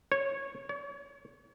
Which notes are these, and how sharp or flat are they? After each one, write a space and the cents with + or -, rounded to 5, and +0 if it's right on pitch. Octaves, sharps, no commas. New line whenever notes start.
C#5 -15
C#5 +40